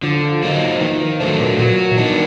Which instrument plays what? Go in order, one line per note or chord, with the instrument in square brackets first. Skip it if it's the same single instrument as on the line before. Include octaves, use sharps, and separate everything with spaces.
[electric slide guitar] D3 [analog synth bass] F3
[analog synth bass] F3
[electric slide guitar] F#3 A#3 D#4
[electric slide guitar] D#3 [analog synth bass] E3
[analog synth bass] F3
[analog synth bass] E3 [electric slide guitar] F#3 A3 D4
[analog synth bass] A#2
[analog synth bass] A#2 [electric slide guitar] F#3
[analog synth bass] E3
[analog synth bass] D#3 [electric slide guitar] B3 D4